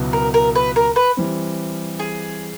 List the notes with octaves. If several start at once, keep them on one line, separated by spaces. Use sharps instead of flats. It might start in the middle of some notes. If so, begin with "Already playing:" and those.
Already playing: C#2 B2 F#3 B3 E4
A#4
A#4
B4
A#4
B4
E3 G3 C4
G#4